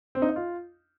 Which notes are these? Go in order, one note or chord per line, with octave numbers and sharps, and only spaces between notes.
C4
D#4
D#5
F4